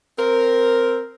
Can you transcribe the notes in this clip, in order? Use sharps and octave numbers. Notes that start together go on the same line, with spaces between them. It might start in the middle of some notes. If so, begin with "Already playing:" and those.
C4 A#4